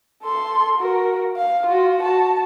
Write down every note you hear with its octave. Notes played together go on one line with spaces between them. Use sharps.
A4 C6
F#4 A#4
F5
F4 F#4
F#4 A5